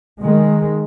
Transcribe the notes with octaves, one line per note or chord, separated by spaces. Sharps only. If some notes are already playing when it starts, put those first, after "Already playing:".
D#3 G#3